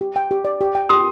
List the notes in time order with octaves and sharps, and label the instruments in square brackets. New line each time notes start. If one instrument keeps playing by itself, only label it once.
[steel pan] G4
G5
G4
D5
G4
G5
[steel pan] G4 [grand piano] C6 D#6